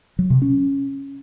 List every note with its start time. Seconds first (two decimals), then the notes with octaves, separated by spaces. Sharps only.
0.19 F#3
0.30 C3
0.42 C#4